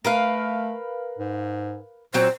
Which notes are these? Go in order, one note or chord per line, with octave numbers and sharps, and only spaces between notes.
A3 A#4 B4 F5
G#2
A#2 F#3 C4 C5